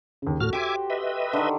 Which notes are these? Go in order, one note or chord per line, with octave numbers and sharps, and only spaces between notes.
D#2 C#3
A2 F#4 A4 F6
G4 C5 E5 G#5 D6
B4 D#5 E5
D3 D#3